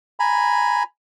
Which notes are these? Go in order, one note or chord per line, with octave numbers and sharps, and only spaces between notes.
G#5 A#5 B5